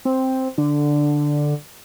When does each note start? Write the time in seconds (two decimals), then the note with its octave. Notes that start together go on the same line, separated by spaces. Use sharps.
0.05 C4
0.58 D3